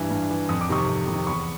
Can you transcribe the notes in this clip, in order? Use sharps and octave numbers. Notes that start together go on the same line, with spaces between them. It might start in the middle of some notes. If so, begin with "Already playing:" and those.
Already playing: G2 E3
G2
E3
F2 D#6
D6
C3 D#3 C#6 D#6
F2
C3 D#3
E2 B5 C#6